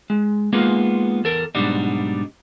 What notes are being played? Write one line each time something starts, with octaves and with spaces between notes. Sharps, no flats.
G#3
G#3 A#3 B3 D#4 F4 G#4
E2 A4 A#4
G#2 B2 F#3 G3 D4 D#4